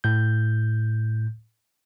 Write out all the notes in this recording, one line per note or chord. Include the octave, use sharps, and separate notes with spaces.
A2 G6